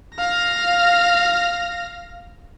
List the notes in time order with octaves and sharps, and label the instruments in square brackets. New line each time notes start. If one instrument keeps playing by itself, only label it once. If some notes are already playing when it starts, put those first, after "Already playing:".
[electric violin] F5 A#6